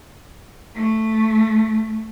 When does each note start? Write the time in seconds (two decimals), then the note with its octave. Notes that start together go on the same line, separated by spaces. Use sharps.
0.75 A3